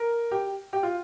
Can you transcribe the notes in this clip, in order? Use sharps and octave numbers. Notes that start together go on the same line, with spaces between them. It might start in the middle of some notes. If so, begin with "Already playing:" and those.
Already playing: A#4
G4
G4
F4